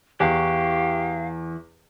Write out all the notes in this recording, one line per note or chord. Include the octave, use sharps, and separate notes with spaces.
E2 E3 G4 F5 C#6 F#6